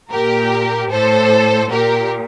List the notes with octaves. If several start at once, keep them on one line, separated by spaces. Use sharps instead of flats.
A#2 G4 A#4
A2 A4 C5
A#2 G4 A#4